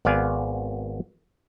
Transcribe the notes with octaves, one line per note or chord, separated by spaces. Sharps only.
G#1 B3 D5 F5 G#5